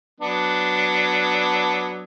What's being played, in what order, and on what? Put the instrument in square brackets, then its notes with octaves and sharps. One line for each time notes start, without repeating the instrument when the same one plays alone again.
[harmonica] F#3 B3 D4